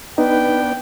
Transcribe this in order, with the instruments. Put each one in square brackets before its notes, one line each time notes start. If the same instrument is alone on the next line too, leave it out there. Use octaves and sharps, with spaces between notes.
[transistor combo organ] B3 D4 [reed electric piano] D#4 [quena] B4 [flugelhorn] G5